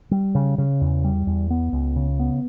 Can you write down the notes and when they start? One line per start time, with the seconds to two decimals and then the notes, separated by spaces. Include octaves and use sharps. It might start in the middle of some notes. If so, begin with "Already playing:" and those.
0.11 G3
0.35 C#3
0.58 C#3
0.81 E2
1.04 G3
1.27 E2
1.50 B3
1.72 C#2
1.96 C#3
2.19 B3